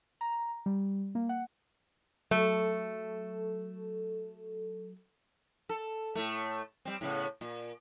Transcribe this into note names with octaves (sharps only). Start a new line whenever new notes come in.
A#5
G3
A#3
F#5
F#3 A3 A4
A4
A2 A3
G3 C4
A2 C#3 B3
A#2